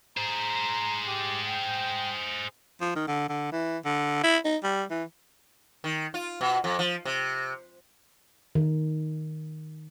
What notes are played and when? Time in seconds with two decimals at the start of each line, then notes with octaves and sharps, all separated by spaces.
0.17 G#4 C5 A#5
1.07 G4
1.47 G5
2.81 F3
2.96 D#3
3.08 D3
3.29 D3
3.52 E3
3.85 D3
4.24 E4
4.45 D#4
4.64 G3
4.90 E3
5.84 D#3
6.14 F4
6.41 B2
6.64 F2
6.79 F3
7.05 C3
8.55 D#3